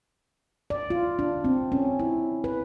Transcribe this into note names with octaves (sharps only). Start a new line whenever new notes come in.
D5
F4
D4
C4
C#4
E4
B4